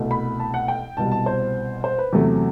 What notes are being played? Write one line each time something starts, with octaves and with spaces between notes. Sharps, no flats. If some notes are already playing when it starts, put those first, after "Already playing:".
Already playing: C2 B2 A3
B5
A5
F#5
G5
C2 B2 G3 A5
A5
C5
C5
B4
E2 C3 F#3 A3